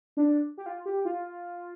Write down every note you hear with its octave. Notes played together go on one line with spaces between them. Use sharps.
D4
G4
F4
G4
F4